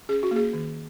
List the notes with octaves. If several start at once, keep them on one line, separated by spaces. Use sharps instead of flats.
C#4 G#4
F#4
A#3 G#4
D#3